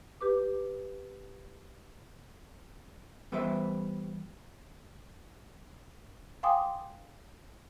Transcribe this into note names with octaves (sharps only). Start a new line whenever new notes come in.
G4 B4 D6
E3 G3 B3 B4 C5 E5
F5 G5 G#5 C6 D6 D#6